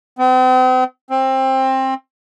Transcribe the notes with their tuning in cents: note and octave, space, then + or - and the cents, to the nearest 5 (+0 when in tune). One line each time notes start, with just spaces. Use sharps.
C4 -40
C4 +20